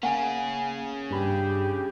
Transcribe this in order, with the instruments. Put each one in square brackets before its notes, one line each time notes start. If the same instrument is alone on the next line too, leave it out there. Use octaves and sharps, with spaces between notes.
[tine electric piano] A#3 [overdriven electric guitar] C#4 G#4 [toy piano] F#5 G#5
[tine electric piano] G2 B5 [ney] G4